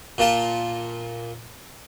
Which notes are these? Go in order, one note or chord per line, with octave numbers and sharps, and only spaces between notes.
A#2 F4 A5